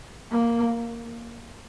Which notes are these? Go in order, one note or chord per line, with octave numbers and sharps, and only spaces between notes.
A#3